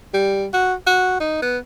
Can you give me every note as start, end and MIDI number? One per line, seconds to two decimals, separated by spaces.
0.14 0.46 55
0.54 0.74 66
0.87 1.16 66
1.21 1.40 63
1.42 1.58 59